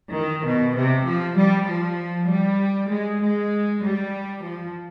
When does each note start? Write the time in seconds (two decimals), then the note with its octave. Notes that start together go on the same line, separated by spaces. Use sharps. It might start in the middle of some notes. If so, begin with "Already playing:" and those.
0.14 D#3
0.45 B2
0.76 C3
1.08 F3
1.38 G3
1.68 F3
2.30 G3
2.92 G#3
3.22 G#3
3.83 G3
4.44 F3